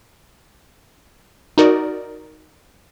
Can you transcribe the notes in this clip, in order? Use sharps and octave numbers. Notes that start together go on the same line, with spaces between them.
D#4 F#4 A#4 D5